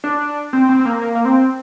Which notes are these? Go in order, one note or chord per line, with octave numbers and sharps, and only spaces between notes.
D4
C4
C4
C4
A#3
A#3
A#3
C4